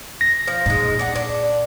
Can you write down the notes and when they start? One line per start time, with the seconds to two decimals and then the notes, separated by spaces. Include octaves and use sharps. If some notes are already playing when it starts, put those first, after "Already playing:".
0.21 A#6
0.47 F3
0.66 A#2 G#3 D#4
0.99 D4 F#5
1.15 D4